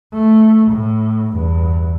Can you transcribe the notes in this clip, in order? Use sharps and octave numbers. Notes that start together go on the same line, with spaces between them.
A3
A2
E2 G2